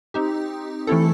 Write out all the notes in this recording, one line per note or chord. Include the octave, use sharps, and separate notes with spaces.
C4 D#4 G4
E3 A3 C4 E4 A4